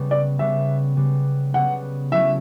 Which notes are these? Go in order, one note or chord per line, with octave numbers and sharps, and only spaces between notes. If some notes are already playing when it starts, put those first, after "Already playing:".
Already playing: C#3 G3 B3
D5
C#3 G3 B3 E5
C#3 G3 B3
C#3 G3 B3 F#5
C#3 F#3 A3 C#4 E4 E5